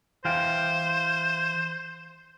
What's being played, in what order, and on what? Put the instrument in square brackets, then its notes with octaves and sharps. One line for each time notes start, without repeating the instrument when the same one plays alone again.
[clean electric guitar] E3 F5 G5 [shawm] C5